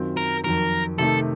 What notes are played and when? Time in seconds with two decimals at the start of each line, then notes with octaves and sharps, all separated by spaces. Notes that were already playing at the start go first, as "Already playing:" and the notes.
Already playing: F#2 D#3 F#3 C4 F4
0.17 A#4
0.44 F2 D#3 F#3 A#4
0.98 C3 D#3 A3 D#4 A4